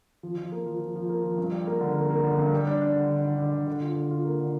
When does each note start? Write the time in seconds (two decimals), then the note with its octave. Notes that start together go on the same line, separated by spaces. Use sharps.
0.23 F3
0.37 F3
0.52 A#3
0.66 F3
0.81 F3
0.96 F3
1.09 A#3
1.24 F3
1.38 G2
1.52 G3
1.67 A#3
1.81 D3
1.96 A#3
2.10 A#3
2.24 D3
2.38 G2
2.53 G3
2.67 D4
2.82 D4
2.96 D3
3.10 D3
3.25 D3
3.38 D3
3.54 D3
3.67 D3
3.81 F4
3.96 D3
4.11 F4
4.24 A#3
4.40 D3